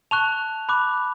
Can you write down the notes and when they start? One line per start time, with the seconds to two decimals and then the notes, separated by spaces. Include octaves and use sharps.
0.11 A5 C#6 F#6 F7
0.69 B5 D6 F#6